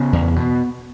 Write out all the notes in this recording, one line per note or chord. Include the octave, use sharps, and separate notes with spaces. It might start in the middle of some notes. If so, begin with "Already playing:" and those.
Already playing: C#3 B3
E2
B2